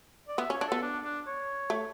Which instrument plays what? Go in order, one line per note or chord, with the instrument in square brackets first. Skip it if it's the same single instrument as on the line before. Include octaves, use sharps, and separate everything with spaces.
[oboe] D5
[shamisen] B3 [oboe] E5
[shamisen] C#4
[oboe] C#5
[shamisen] D4
[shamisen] B3 [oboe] A4
[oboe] D4
D4
C#5
[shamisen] A3